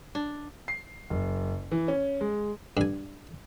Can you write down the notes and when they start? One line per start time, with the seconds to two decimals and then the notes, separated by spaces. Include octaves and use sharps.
0.15 D4
0.68 C7
1.10 F#1
1.71 E3
1.88 C#4
2.21 G#3
2.77 G2 G#5